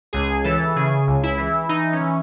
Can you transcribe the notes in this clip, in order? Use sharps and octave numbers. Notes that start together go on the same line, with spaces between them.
C#2 G#4
E3 A4
C#3 G#4
C#2
E4
E3
E3 D#4
C#4
E3